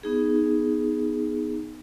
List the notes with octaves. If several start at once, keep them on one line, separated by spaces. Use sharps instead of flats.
B3 D#4 G#4